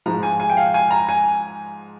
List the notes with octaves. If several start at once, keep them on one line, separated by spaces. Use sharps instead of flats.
G#2 F3 G#3 A#5
G#5
G#5
G5
F5
G#5
A#5
G#5